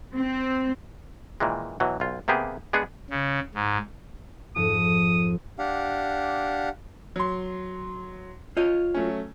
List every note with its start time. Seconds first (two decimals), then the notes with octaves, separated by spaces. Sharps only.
0.16 C4
1.40 A#2 D#3 E3 G#3
1.80 B2 E3 F#3
2.00 B1 F4
2.28 C3 A#3 B3 G4 G#4
2.73 G#3 B3 D4 G#4 F#5
3.10 C#3
3.55 G#2
4.56 F2 G#2 F3 D#6
5.59 D4 G4 F5 F#5
7.16 F#3 C6
8.57 F4 C#5 D#5
8.94 F#3 A3 C#4